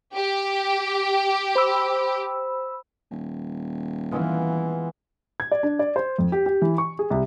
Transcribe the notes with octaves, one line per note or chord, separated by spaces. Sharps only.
G4
C5 B5 E6
D#1
E3 G#3 B3 F4
G#6
D5
D4
D5
C5
F2
G4
G4
E3
C#6
G#4
C2